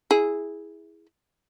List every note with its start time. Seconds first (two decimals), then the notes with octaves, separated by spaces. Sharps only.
0.11 E4 G#4